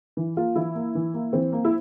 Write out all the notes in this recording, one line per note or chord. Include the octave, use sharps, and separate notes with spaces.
E3
A#3 F4
E3 E4
A#3
E3
A#3
E3 C4
A#3
E4